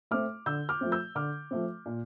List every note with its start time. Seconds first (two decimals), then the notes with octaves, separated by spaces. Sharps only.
0.11 A3 C4 D6 F6
0.46 D3 E6 G6
0.69 D6 F6
0.81 F3 A3 C4
0.92 E6 G6
1.15 D3 D6 F6
1.51 F3 A3 C4
1.86 A#2